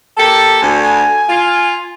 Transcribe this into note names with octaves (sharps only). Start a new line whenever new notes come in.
A#3 G4 A4
D2 G#5
G#5
F4